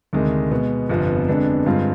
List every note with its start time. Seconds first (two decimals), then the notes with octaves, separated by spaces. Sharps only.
0.13 D2 C3 D#3 G#3
0.51 B2 G#3 B3
0.89 G1 F2 C3 F3 B3
1.28 F2 D3 G#3 B3 D4
1.66 G2 D3 G#3 C4 F4